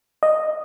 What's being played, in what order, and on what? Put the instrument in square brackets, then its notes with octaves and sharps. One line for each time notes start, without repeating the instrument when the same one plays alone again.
[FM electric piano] D#5